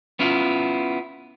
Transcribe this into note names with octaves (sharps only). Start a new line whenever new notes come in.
B3 C#4 E4 F4